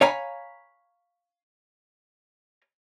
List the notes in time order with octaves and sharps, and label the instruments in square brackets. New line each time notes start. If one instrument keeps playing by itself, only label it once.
[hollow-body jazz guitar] C#5 F5 G#5 A#5 B5